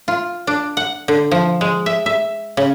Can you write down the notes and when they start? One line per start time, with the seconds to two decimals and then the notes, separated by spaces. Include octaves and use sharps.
0.08 F4
0.47 D4
0.77 F#5
1.08 D3
1.31 F3
1.61 G#3
1.86 E5
2.06 E5
2.57 C#3